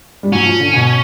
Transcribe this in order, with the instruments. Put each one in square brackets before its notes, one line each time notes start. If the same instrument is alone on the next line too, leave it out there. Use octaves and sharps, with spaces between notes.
[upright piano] G3
[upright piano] F#3 [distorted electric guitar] C#4
[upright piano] F3
D3
B2